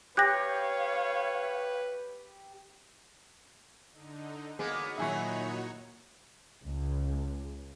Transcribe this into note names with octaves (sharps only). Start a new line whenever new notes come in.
G4 B4 C#5 F5 F#6 A#6
D3 D#4
G#3 A#3 B3 D#4 F#4 G#4 C#5
A#2 D#3 F#3 E4 E5 G#5 C#6
C#2